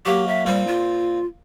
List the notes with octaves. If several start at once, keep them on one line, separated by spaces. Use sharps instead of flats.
F#3 A#3 G4
E5
A#2 G3 C4
F4